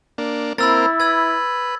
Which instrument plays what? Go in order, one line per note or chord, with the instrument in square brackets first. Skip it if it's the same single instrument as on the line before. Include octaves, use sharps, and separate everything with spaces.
[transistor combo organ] A#3 D4
[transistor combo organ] A#3 C4 A#4 [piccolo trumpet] E4 [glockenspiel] B5 E6 A6
[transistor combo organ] B4 [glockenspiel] E6 G#6